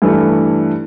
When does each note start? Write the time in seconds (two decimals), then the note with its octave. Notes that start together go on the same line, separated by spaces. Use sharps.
0.02 G2 E3 A3